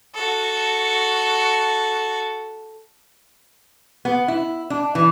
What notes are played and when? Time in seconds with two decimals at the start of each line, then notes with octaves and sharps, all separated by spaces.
0.15 F#4 A4
4.05 B3
4.28 E4
4.70 D4
4.95 E3